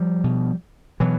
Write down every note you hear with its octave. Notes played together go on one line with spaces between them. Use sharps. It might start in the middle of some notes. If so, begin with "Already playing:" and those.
Already playing: F3 G3
B2
B2 E3 F#3